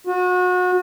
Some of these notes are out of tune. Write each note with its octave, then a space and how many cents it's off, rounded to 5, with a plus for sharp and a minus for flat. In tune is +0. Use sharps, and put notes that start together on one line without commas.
F#4 -35